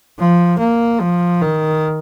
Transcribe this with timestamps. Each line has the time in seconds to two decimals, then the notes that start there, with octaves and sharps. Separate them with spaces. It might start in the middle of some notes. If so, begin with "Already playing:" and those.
0.19 F3
0.59 A#3
1.01 F3
1.42 D#3